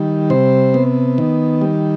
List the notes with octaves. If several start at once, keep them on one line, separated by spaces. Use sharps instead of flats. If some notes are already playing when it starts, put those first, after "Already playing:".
Already playing: D#3 G3
C3 C5
B3
D#3
G3